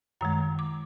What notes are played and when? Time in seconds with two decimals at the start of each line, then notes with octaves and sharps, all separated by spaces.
0.21 F#2 D#3 G#3 A#5
0.59 D6